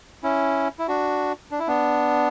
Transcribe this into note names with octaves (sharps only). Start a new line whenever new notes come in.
C#4 E4
E4
D4 F#4
D4
E4
B3 D4